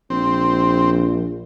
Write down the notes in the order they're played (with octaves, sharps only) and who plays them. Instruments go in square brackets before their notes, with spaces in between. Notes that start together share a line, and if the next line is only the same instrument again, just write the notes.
[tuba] A#1 [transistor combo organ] C4